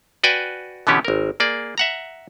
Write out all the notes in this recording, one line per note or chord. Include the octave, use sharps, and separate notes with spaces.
F#4 B4 D5 G5 G#5
B2 D3 E3 B3 C#4 G4
G#1 A#4
A#3 G#4 D5
E5 F#5 A#5